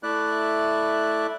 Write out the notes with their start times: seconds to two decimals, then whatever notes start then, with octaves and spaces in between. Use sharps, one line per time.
0.03 A3 E4 D5 F#6